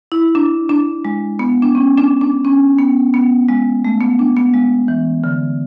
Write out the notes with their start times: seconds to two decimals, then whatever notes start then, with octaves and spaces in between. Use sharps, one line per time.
0.12 E4
0.35 D4
0.69 D4
1.05 G#3
1.39 B3
1.62 D4
1.75 C#4
1.98 D4
2.21 D4
2.45 C#4
2.79 B3
3.14 B3
3.49 G#3
3.85 A3
4.01 B3
4.19 D4
4.36 B3
4.54 G#3
4.88 E3
5.24 D3